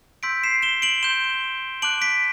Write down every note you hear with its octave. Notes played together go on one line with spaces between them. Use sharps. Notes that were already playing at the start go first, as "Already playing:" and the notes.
C6 E6 G6 B6 D7
C7 E7
E7 G7
D7 F#7
C6 G6 E7 G7
A5 D6 F#6 D7 F#7
B6 D7